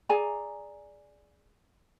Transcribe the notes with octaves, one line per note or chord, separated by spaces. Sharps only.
G#4 D5 G#5 A#5